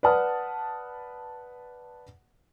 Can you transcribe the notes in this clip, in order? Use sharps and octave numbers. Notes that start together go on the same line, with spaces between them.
B4 D5 F#5 A5 D#6 F6